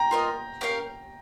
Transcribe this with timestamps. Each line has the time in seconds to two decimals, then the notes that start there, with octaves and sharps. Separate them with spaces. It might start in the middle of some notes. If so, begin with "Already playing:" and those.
Already playing: G5 A#5
0.11 F4 A#4 D#5
0.61 C#4 G4 A#4 F5